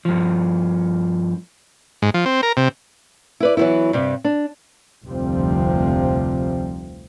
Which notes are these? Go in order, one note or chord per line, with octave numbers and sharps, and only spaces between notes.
G2 F3
G#2
F3
C4
A#4
C3
E4 B4 D5
E3 F#3 G#3 B3 E4
G2 C3 G3
D4
F1 D2 C3 F3 G3 C4